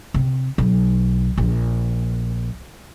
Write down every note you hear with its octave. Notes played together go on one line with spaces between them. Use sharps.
C3
B1
A#1